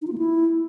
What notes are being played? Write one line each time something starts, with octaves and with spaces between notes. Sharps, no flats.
D#4
F4
A#3
E4